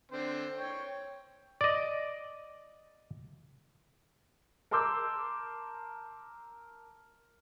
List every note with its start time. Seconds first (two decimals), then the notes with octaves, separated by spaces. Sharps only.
0.12 D3 C4 C5
0.57 C#5 G5
1.61 D5 D#5
4.71 A#4 A5 C6 D6 E6 G6